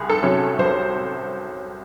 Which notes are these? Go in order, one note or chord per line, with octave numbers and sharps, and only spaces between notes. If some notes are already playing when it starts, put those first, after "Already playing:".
Already playing: C2 G#4
A4
C3 F#3 C#4
C2 C5